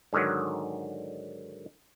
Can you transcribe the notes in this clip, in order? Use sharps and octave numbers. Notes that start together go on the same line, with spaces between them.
G#2 D3 D#3 F#3